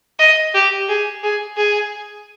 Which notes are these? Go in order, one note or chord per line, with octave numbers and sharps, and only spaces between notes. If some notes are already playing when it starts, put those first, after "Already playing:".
D#5
G4
G#4
G#4
G#4